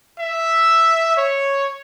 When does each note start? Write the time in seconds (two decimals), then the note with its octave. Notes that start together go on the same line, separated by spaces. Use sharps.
0.18 E5
1.16 C#5